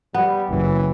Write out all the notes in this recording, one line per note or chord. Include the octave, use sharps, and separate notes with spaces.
G3 B3
F#1 E3